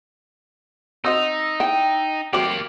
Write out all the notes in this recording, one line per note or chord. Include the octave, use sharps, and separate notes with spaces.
C4 D#4 F#4 C5 D#5 D#6 E6
E4 G5
F#3 A3 A#3 C4 G4 D6 F#7